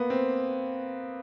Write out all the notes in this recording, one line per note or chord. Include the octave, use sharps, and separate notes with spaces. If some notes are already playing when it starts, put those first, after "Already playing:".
Already playing: A#3 B3
C4